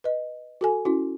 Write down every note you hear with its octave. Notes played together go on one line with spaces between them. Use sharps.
B4 D#5
F#4 A4 G#5
C#4 E4 F#4